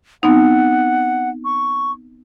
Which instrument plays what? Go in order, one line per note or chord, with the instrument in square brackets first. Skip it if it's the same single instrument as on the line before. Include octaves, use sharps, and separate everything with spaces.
[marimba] B3 C4 D#4 [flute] F#5
[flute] C#6